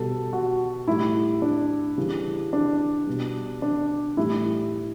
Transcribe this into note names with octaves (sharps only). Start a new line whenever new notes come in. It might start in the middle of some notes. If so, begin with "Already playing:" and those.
Already playing: B2 G3 A4
F#4
A2 G3 E4
D4
C#3 E3 G3
D4
B2 G3
D4
A2 E3 G3 E4